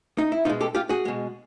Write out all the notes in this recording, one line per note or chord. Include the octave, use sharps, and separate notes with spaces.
D#4
E4
B2 G#3 D#4 F4
G4 A4
F4 G4
F#4 G#4
B2 G#3